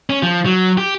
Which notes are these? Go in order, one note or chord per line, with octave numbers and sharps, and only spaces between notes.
C#4
F3
F#3
G4